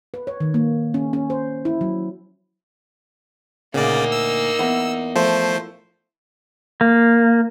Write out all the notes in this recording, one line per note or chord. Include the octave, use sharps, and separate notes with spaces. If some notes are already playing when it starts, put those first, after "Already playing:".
B4
C#5
D#3
A#3
C#4
C#4
C5
E4
F#3
D2 A#2 C#3 A#3 D#4 D5
E6
E2
F3 A3 C5
A#3